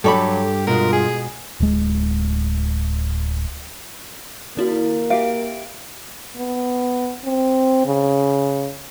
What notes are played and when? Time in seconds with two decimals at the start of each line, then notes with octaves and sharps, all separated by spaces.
0.04 G2 F#3 G4 A4 C#5 B5
0.67 B2 G#3 F4 A#4
0.92 G#4
1.60 D1 G#3
4.57 D#3 A#3 E4 F#4
5.10 G4 E5 F5 D7
6.36 B3
7.25 C4
7.85 C#3